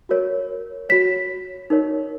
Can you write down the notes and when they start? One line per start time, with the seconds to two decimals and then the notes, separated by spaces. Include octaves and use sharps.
0.09 F#4 A#4 C#5
0.89 F#4 C#5 B6
1.70 D#4 A#4 C#5